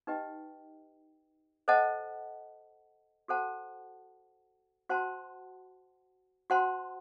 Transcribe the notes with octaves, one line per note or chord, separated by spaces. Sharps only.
D#4 G4 B4 D#5 G5
A4 C5 D#5 F#5 A5
F#4 A4 C5 F#5 A5
F#4 C5 F#5 A5 C6
F#4 C5 F#5 A5 C6